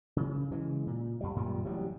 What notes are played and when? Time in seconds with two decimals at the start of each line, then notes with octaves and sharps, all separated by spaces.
0.16 C#3
0.50 C#3 E3 G#3
0.87 A#2
1.21 F2 G3
1.36 F#2 A#2 D#3 G3
1.64 A1 C3 F#3 G3